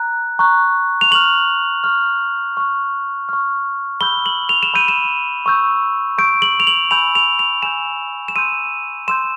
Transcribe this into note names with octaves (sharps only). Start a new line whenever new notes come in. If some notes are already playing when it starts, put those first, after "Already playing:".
Already playing: A#5 F#6
A#5 C#6 F#6
F7
C#6 F6 F#7
C#6 F6
C#6 F6
C#6 F6
B5 E6 G6 G7
F#7
F7
E7
B5 E6 G6 D#7
E7
C#6 E6 G6
C#6 E6 G6 D7
F#7
F7
F#7
G#5 B5 E6 G6 F7
F7
F7
G#5 B5 E6 G6 E7
E7
C6 E6 G6 D#7
C6 E6 G6 E7